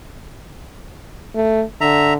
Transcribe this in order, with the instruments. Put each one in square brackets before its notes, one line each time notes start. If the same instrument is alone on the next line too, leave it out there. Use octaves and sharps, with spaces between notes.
[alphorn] A3
[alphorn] D3 [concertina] E5 A#5